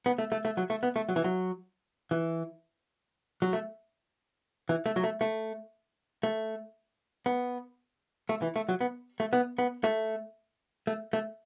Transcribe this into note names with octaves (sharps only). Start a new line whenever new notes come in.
B3
A3
A3
A3
F#3
A3
B3
A3
F#3
E3
F#3
E3
F#3
A3
E3
A3
F#3
A3
A3
A3
B3
A3
E3
A3
F#3
B3
A3
B3
B3
A3
A3
A3